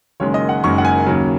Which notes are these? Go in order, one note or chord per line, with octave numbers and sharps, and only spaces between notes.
F#1 F#2 D#3 G#3 C#5
D#5
F#5
F#1 F#2 D#3 G#3 C#6
F#5
G#5
D#2 C#3 F#3